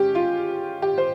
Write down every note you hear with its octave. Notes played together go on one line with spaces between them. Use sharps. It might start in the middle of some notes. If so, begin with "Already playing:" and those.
Already playing: G#3 C#4 G4
F4
G4
C5